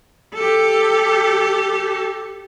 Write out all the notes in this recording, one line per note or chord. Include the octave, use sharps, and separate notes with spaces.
G4 A4